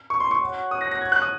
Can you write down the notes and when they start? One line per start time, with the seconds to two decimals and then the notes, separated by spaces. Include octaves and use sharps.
0.10 C#6
0.20 C6
0.31 C#6
0.41 F#4 C#5 F#5
0.71 D#6
0.81 A#6
0.91 A#6
1.01 G#6
1.12 F#6
1.22 D#6